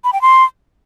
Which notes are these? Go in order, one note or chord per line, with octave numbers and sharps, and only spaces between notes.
B5
G5
C6